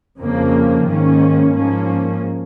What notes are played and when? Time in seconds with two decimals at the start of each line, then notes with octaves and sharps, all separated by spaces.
0.19 F2 C#3 F3 A#3
0.86 G#2 D#3 A#3 C#4
1.52 G#2 F3 A#3 C#4